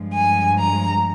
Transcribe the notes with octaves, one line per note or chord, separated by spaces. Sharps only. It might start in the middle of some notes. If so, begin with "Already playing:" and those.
Already playing: G2 F3 G#3
G#5
A#5